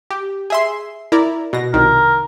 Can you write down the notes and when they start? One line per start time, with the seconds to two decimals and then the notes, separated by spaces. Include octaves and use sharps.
0.11 G4
0.50 G#4 E5 C6
1.12 E4 A#4 D5
1.53 B2 A#6
1.74 C2 D#3 A#4